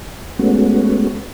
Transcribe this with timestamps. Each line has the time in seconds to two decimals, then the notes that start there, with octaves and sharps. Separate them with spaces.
0.39 G#3 A3 B3 C#4 F#4